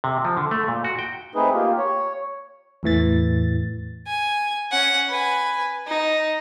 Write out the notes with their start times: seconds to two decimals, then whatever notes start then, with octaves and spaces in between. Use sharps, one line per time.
0.04 C3
0.25 F3
0.37 D3
0.51 A3
0.68 A#2
0.84 F#4
0.99 G5
1.35 A3 C4 D#4 G#4 B4
1.54 A#3 F4 G4
1.78 C#5
2.83 E2 A2 E3 A6
4.07 G#5
4.72 C#4 F#5
5.09 B4 G#5
5.87 D#4